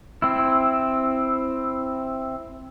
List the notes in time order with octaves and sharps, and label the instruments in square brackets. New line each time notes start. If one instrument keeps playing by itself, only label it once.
[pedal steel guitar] C4 E4